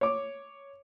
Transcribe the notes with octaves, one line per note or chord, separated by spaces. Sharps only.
C#5 D6